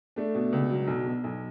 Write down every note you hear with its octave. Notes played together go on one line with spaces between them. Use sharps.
A3 D4
B2
C#2
F#3
B1
B2
B1